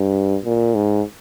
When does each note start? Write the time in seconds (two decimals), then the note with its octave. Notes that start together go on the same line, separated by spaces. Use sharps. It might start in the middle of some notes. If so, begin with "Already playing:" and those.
Already playing: G2
0.45 A#2
0.75 G#2